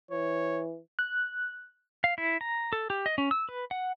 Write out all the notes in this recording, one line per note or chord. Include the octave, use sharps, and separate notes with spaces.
E3 C#5
F#6
F5
E4
A#5
A4
G4
D#5
C#4
E6
B4
F#5